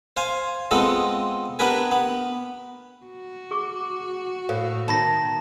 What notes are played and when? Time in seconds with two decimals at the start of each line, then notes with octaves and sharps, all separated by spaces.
0.17 C5 F5 G#5
0.71 G#3 B3 C4 F4 A4 D#5
1.59 B3 D4 G4 A#4 B4 G#5
1.91 B3
3.05 F#4
3.51 G#4 C#6 D6
4.49 A2 A4 C5 F5
4.88 B2 D#3 A5 B5 A#6